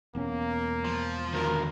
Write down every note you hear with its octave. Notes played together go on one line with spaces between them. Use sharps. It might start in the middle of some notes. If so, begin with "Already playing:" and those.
E1 A#3 B3 C#4
F3
D3 D#3 F#4 A#4